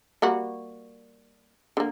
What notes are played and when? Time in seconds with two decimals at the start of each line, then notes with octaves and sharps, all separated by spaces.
0.22 G3 A#3 F#4
1.77 D3 A#3